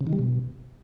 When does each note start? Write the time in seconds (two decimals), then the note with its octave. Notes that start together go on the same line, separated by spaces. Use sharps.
0.01 C#3
0.07 D#3
0.13 G3
0.19 B2